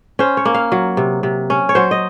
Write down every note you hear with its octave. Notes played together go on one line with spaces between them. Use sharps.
C#4 C5
C#5
A#3
F5
F#3
C3
C3
C#4
C#5
F#3 C5
D#5